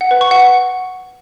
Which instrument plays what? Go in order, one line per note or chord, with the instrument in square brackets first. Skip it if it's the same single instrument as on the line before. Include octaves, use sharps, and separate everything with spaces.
[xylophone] F#5
B4
C#6
F#5